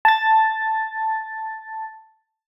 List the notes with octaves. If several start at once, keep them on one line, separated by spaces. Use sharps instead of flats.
A5 A6